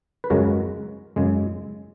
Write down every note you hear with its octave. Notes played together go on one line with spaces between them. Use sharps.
B4
F#2 C#3 G#3 F#4 A#4
F#2 C#3 G#3